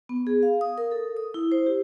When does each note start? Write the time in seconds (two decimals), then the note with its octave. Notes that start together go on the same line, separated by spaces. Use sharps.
0.09 B3
0.27 G#4
0.43 F5
0.61 D#6
0.78 A#4
0.92 A4
1.17 D#6
1.34 E4
1.52 C5
1.66 G4